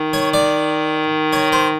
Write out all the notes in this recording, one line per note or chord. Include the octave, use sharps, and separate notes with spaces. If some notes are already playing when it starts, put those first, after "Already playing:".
Already playing: D#3
C#5
D5
C#5
C5